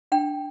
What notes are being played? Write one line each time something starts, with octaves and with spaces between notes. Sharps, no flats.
D4 G5